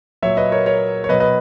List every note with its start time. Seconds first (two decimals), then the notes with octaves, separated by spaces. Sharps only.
0.22 A#2 F#3 C#5 E5
0.37 B4 D#5
0.51 A#4 C#5
0.66 A#4 C#5
1.04 C#5
1.09 B2 F#3 B4 D#5
1.20 B4 D#5